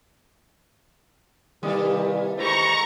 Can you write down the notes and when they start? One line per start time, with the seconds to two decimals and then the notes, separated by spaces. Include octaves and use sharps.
1.63 C3 D#3 E3 G3 A#3 A4
2.37 D#3 G#3 A3 E4 G4 C5 A#5 C#6